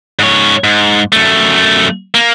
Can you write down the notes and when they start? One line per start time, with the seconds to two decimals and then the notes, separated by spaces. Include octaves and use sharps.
0.19 G#2 C#5
0.64 G#2
1.12 F#2 A3
2.14 A#3